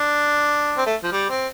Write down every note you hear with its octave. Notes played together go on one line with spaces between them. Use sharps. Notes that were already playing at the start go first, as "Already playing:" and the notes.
Already playing: D4
C4
A3
F3
G3
C4